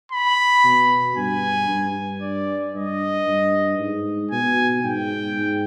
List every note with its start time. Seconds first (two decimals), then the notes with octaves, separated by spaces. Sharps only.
0.12 B5
0.64 B2
1.16 G2 G#5
1.69 G2
2.22 D5
2.74 G2 D#5
3.27 G2
3.79 G#2
4.31 B2 G#5
4.84 G#2 G5
5.36 G#2